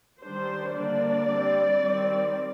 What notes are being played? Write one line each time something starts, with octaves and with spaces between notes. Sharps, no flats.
D#3 G3 D4 C5
D3 G3 A#3 D4 D5
G3 C4
D#3 G3 C4